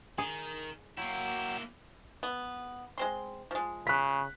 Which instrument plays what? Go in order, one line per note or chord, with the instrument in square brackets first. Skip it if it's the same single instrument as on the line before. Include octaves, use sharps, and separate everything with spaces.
[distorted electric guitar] D#3 [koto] G#4
[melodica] F#3 F#4 G5 [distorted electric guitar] A#3 E4
[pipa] B3
G#3 C4 C6
F3 G#3
[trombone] C#3 [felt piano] F#6 B6